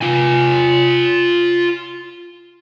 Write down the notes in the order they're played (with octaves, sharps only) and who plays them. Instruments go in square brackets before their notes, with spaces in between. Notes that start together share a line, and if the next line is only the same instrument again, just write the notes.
[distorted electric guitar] F4 G#5